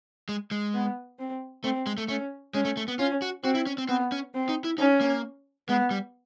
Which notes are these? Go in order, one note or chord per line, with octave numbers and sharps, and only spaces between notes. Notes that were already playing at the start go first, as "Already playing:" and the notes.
G#3
G#3
B3
C4
A3 C4
G#3
A3
A3 C#4
G#3 C#4
A3
A3
B3
C#4 F4
F#4
C4 F#4
E4
C#4
C4
B3 C4
C#4
C4
D#4
E4
C#4 D#4
A#3
G#3 B3
G3